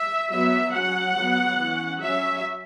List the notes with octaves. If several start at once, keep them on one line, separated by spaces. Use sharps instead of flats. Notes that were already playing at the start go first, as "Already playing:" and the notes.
Already playing: E5
F#3 B3 E5
F#3 C#4 F#5
F#3 B3
E3 C#4
F#3 C#4 E5